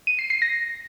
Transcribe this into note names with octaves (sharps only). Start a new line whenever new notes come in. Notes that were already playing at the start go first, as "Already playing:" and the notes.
D#7
C7
C7
A#6